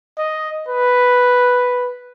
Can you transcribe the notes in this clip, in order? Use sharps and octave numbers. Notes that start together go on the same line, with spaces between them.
D#5
B4